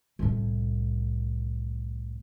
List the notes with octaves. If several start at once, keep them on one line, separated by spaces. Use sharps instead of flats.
C2 A2